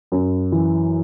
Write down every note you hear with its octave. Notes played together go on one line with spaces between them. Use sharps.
F#2
E3